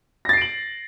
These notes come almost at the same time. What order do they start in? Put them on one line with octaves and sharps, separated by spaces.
A#6 A6 C7 D7 F#7